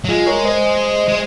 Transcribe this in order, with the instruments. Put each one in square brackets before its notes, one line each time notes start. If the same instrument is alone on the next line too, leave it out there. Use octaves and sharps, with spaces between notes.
[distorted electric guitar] F#3
[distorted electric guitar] G#3 [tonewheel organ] F4 G#4
[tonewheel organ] A#4 C#5
C5 D#5
[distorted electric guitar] G#3